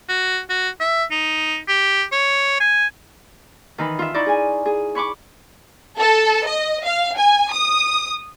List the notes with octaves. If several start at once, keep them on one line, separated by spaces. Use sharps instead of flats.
F#4
F#4
E5
D#4
G4
C#5
G#5
D#3 E3 D#4 B5
F4 E5
D#4 E4 D5 B5 C#6
G#4 G#5
G#4
C#5 B5 C#6 D6
A4
D#5
F5
G#5
D#6